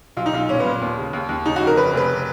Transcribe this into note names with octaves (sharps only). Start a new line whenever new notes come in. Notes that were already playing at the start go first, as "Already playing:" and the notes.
B1 F4
D#4
B1 F4
A#2 C#4
B3
A#2
D#2
C#3
D#2
D#2
C#3 D#4
F#4
F2
A#4
C#3 B4
F1 B4